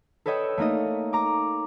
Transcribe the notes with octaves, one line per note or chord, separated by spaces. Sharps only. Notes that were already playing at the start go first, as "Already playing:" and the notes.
A4 B4 C#5 D#5 G5 E6
A3 A#3 D#4 D#5
A#5 D6